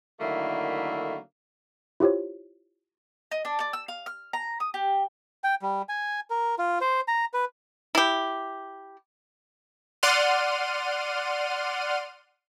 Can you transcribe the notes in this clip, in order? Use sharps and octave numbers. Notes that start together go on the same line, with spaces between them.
D3 D#3 F#3 A3 A#3 E4
E4 F4 G4 C5 C#5
D#5
D4
D5
E6
F5
F6
A#5
D#6
G4
G5
G3
G#5
A#4
F4
C5
A#5
B4
E4 G4
D5 F#5 C6 F6 D#7